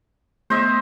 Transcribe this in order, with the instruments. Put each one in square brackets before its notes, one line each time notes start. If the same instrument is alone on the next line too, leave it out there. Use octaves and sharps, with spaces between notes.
[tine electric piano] A3 B3 [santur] C5 D#5 E5